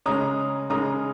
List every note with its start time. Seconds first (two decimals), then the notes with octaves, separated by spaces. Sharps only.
0.06 C#3 G#3 C#4 A#5 D#6
0.70 C#3 G#3 C#4 A#5 D#6